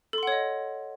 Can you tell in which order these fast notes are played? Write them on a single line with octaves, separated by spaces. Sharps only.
A4 C6 F#5 C#5 D#5